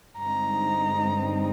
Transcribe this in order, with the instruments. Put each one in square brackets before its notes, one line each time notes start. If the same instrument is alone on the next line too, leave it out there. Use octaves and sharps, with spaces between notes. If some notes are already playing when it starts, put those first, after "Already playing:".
[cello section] G2 D3 G#3 C4 D#4 [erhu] A#5